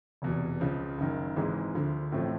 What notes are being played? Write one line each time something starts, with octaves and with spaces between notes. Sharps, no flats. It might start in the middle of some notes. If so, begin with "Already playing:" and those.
F1 E2 B2
C#2 C#3 F3
F#1 F#2 D#3
G#1 G#2 E3 G#3
D2 D3 F3
A1 A2 F3 A3 C4